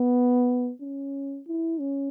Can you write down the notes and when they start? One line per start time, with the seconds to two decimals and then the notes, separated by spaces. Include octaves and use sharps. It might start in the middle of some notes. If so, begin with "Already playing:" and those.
Already playing: B3
0.81 C#4
1.48 E4
1.80 C#4